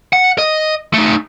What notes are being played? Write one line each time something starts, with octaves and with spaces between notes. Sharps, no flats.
F#5
D#5
A3 D#4